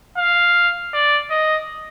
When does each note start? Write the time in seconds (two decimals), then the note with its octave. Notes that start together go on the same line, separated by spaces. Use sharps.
0.18 F5
0.93 D5
1.31 D#5